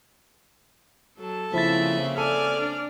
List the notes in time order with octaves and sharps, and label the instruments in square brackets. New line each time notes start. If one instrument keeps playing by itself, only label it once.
[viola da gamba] F#3 [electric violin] A4 A5
[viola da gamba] C#3 A#3 C4 [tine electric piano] F3 E4 A6 [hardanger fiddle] E5
[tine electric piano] A4 [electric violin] D5 F6 [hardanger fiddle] G#5
[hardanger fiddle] D4